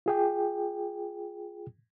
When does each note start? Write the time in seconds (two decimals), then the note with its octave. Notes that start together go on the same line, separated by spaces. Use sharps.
0.06 F4 G#4 G5